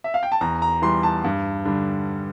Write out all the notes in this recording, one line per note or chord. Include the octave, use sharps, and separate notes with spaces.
E5
F5
G5
A5
E2 A#5
A#5
E3 G3 C6
A5
G2
D3 G3